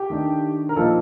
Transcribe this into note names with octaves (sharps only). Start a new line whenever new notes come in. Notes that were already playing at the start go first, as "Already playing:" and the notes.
Already playing: G4
D#3 A3 D4
A#4
A#2 F3 A#3 D#4 A4